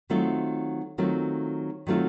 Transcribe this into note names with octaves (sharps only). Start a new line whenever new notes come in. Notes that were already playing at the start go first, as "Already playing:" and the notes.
D#3 F#3 A3 C4 F4
D#3 F#3 A3 C4 F4
D#3 F#3 A3 C4 F4